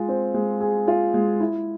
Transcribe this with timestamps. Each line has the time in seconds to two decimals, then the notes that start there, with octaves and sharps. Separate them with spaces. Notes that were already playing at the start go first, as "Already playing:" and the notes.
Already playing: G#3 F4
0.09 C4
0.34 G#3
0.60 G#4
0.88 F4
1.14 G#3
1.40 E4